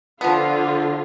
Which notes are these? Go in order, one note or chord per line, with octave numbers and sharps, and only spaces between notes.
D3 F3 B3 F4